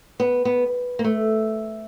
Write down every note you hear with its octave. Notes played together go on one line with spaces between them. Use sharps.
B3
B3
A#3
A3